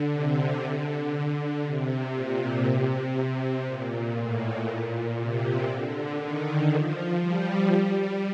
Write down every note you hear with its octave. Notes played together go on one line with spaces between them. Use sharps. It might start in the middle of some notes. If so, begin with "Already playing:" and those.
Already playing: D3
C3
D3
C3
A#2
C3
A#2
A2
A#2
C3
D3
D#3
F3
G3
G3